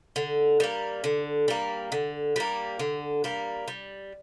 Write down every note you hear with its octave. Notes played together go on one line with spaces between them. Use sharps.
D3
G3 A#3
D3
G3 A#3
D3
G3 A#3
D3
G3 A#3
G3